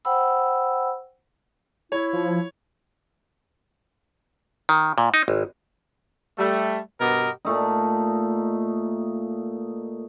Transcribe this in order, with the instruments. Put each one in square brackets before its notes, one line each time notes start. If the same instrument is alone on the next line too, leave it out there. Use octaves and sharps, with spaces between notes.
[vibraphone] C5 F#5 G5 B5 E6
[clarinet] E4 [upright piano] C#5
[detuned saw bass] F3
[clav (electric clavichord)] D#3
A#2
D#4
G#1
[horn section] G3 A3
G2 B2 B3 G4 A#4 D#5
[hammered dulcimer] A#2 A3 D#4